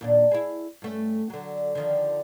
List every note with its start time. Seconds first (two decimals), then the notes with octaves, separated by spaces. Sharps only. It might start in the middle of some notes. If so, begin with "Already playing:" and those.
0.01 D#2 A#2 D4
0.31 E4 G#4
0.82 G2 A3 C#4
1.30 D3 F#3
1.75 D3 D#3 F3